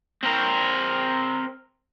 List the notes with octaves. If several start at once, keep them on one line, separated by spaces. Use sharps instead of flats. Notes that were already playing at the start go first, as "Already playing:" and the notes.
C4 A#4